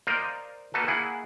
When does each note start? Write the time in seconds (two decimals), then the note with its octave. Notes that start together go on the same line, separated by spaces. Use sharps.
0.07 A#4 C5 D5 D#5 F5
0.74 A#3 D#4 F#4 A4 B4
0.87 A#3 E4 G#4 F#5